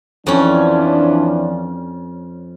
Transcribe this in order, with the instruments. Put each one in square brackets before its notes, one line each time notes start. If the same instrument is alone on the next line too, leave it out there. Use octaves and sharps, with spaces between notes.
[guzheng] F2 C#4 [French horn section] E3 F3 D4